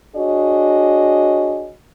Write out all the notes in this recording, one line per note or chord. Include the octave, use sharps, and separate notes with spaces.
D4 F#4 G#4 C#5 D#5